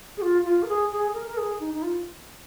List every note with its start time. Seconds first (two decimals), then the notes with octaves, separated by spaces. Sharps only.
0.17 G#4
0.22 F4
0.45 F4
0.63 A#4
0.68 G#4
0.92 G#4
1.14 A#4
1.28 A#4
1.37 G#4
1.60 D#4
1.74 D#4
1.83 F4